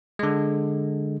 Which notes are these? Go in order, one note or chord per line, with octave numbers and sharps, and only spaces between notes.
D3 G#3